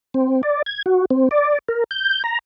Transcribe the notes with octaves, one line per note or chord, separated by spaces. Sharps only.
C4
D5
G#6
F#4
C4
D5
A#4
G6
A#5